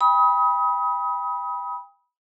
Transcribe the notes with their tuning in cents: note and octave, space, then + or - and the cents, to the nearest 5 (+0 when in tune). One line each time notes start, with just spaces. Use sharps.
G5 +35 B5 -15 D#6 +30